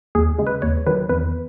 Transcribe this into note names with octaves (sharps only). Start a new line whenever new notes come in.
D#2 G#4
C#3 G#3
B4
D#2 C#5
D#3 F#3 B4
E2 B4